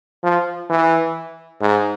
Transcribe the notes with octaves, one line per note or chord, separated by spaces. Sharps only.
F3
E3
G#2